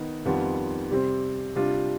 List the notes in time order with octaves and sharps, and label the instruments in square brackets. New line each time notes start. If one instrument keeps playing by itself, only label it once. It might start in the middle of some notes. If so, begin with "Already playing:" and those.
Already playing: [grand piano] D#3 B3 D#4
F2 D#3 G3 B3 F4
C3 G3 C4
C3 G3 D4 F4